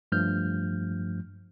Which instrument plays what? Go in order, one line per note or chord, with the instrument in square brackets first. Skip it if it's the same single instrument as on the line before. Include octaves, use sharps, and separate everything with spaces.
[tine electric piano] G2 F3 A3 F6 G6